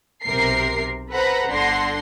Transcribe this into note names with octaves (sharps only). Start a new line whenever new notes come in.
B1 C3 A#4 C7
A4 B4 C5 F#5 A#5 B5
G1 D3 F#5 C6 A#6 C7